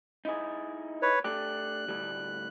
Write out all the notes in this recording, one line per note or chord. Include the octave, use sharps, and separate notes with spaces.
D#4 E4 G#4
B4 C#5
A3 D4 G4 F#6
D2 A2 G3